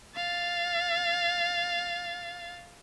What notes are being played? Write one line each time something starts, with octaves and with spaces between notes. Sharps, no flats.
F5 A6